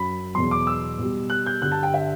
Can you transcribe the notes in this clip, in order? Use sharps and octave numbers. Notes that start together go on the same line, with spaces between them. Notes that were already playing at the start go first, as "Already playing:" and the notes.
Already playing: F#2 F#3 B5
E2 B2 F#3 C6
D6
E6
B2 G3
F#6
G6
G2 D3 G3 F#6
A5
G5
E5